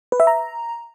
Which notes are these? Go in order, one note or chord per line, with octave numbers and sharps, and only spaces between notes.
B4
E5
A#5